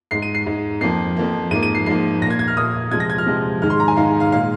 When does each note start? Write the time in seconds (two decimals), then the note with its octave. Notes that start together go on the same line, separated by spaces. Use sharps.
0.11 G#2 G#3 C7
0.22 D#7
0.35 C7
0.46 G#2 G#3
0.81 F2 F3 A#3 C7
1.16 F2 F3 A#3
1.51 G#2 F3 A#3 D#7
1.63 D#7
1.75 C7
1.86 G#2 F3 A#3 C7
2.22 A#2 A#6
2.26 A#3 G#6
2.39 G#6
2.48 F6
2.57 A#2 A#3 D#6
2.91 C3 F3 G#3 G#6
3.00 A#6
3.10 G#6
3.18 F6
3.26 C3 F3 G#3
3.62 G#2 D#3 G#3 F6
3.70 C6
3.80 A#5
3.88 G#5
3.97 G#2 D#3 G#3 F5
4.20 F5
4.32 A#2 G#3 F5